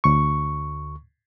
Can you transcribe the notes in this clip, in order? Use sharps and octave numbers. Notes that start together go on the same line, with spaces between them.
D2 C#6